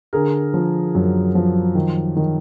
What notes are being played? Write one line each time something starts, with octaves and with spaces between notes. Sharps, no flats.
D3 G#4 A#4
F3
F#2
F3
D#3
D#3